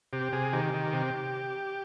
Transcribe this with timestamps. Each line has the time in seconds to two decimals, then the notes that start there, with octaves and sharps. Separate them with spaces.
0.13 C3 G4
0.32 C3 G#4
0.53 D#3 G4
0.74 D#3
0.93 C3